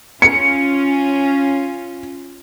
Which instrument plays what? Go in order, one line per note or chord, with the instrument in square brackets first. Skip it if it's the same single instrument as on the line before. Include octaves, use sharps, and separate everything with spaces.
[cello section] C#4 F4 [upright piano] C#7